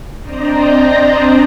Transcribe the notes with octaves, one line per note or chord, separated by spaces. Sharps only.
C4 D4 C5 D5 D#5 A#5